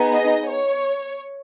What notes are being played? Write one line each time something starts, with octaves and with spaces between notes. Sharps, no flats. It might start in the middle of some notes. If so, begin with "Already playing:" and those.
Already playing: B3 D#4 G#4
D#5
C#5